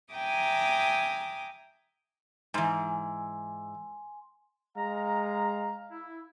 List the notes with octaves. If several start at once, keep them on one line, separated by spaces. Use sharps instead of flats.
E5 G5 G#5 A#5 D6 D#6
G#2 E3 G#5 C6
G#3 F5 A#5
E4